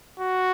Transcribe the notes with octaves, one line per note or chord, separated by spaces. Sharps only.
F#4